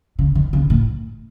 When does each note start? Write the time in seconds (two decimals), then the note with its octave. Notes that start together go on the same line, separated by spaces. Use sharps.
0.19 C#3
0.35 D#3
0.53 C#3
0.70 A2